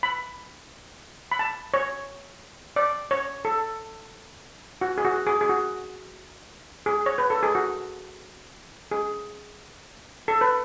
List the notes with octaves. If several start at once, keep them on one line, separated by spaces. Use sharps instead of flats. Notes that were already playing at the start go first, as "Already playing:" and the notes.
B5
B5
A5
C#5
D5
C#5
A4
F#4
G#4
F#4
G#4
G#4
F#4
G#4
C#5
B4
A4
G#4
F#4
G#4
A4
B4